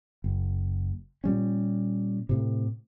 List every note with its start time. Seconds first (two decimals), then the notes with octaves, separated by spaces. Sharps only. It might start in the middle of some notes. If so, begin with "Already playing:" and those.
0.24 F#1
1.24 A#2 G3 C#4
2.29 A2 C3